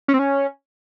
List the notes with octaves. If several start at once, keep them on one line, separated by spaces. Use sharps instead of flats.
C#4
C4
C#4